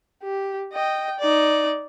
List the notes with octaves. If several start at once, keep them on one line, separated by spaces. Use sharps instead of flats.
G4
D#5 G5
D#4 D5